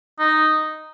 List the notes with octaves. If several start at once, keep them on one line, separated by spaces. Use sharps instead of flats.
D#4